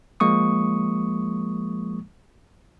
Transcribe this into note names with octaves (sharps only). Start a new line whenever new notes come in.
F3 G#3 A#3 C#6 D#6